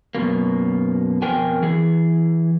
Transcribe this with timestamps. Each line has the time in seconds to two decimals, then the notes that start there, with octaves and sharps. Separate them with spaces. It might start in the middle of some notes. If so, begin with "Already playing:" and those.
0.15 F#2 B2 A#3
1.22 F2 B2 A#4 G5 G#5
1.62 E3 G#4